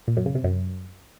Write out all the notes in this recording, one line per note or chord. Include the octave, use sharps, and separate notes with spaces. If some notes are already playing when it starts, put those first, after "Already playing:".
A#2
F#2
C#3
C3
F#2